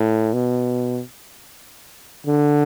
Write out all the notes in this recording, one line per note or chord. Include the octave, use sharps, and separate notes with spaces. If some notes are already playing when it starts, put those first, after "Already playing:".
Already playing: A2
B2
D3